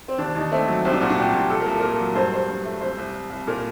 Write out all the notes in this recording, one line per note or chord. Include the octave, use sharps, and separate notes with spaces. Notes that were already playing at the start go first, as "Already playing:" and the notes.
C4
D#2 D4
D#2 D#4
A3 C4
F#3
C2 C4
D4
A#2 F#4
D4
C2 G4
A#2
A#2 A4
A#4
C2 A4
A#3 A#4
A4
F#3
G2 C5
G2 C5
G2
A3
C2 C5
C2
C2
C2
A#2 A#4